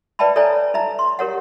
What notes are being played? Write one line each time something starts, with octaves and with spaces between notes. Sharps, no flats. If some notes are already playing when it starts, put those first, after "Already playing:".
B4 D5 E5 G5 A5 B5
A4 C#5 D5 E5 G#5 A#5
D#4 E5 A#5
C6
G4 A#4 C#5 F#5